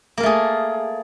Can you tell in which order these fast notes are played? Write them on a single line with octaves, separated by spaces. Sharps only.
A#3 A#4 A3 G#4